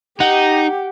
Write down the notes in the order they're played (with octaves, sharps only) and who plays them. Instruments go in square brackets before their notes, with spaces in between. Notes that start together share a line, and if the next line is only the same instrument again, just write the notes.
[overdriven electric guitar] D#4 [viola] G4 [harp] F#5